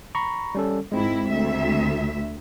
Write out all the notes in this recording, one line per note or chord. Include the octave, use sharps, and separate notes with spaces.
A#5 B5 C#6
G3 C#4 A4
G#2 G#3 C4 E4
D2 E5